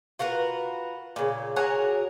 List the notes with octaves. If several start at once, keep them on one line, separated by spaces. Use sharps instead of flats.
F4 F#4 A#4 B4
A#2 C#3
F#4 G#4 A#4 C#5